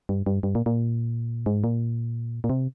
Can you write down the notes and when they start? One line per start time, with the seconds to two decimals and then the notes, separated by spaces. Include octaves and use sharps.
0.09 G2
0.26 G2
0.43 G2
0.55 A#2
0.66 A#2
1.46 G#2
1.64 A#2
2.44 A#2
2.50 C3